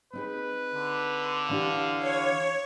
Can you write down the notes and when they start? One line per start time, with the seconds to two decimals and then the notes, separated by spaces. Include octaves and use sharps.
0.13 C4 D#4 G#4 B4
0.74 D3
1.49 E3 D4 G4 F5
1.99 C#5